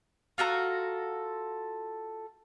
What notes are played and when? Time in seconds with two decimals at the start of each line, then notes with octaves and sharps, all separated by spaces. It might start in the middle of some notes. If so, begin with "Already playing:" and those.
0.38 F4 F#4 A4 A#5